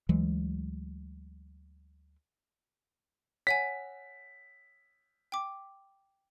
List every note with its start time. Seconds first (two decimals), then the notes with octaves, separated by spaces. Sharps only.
0.09 D2 E3 F#3 G#3
3.47 C#5 F#5 G#5 B6
5.32 G5 D6